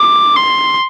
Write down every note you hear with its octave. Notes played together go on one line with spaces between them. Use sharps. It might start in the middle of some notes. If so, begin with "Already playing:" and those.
Already playing: D6
C6